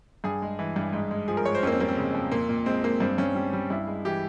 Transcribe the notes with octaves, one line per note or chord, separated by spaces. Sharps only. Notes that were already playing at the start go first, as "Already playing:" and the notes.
G2 G#4
G#3
E3
G2
G#2
G#3
F3 G#4
A#4
G#2 C#5
C5
F2 A#3 C#4
C4
G3 A#3
C4
C#3
F2
A#2 A#3
A#2
G#3 C4
G#3 A#3
G2 C4
G2 C#4
G3
G3
G2 E4
G#3
E3 G4